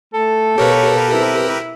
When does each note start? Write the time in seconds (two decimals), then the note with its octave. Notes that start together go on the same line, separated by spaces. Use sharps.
0.14 A3 A4
0.58 B2 G4 A#4 B4 C#5 F5
1.12 C4 E4